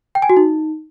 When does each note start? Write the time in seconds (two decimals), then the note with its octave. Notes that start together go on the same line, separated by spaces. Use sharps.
0.15 G5
0.22 G#5
0.30 F#4
0.37 D#4